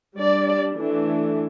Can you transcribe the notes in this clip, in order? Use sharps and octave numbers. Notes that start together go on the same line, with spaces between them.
G3 D4 D5
E3 A3 D4